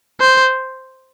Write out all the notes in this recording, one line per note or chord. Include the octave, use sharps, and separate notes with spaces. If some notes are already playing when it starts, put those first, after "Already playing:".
C5